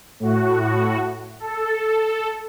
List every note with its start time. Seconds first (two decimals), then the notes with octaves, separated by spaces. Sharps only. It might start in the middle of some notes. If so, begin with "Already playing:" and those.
0.20 A2 F#4
1.40 A4